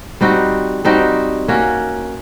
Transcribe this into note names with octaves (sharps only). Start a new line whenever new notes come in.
G3 C4 D#4 F#4
G3 C4 D#4 F#4
A#3 C#4 F#4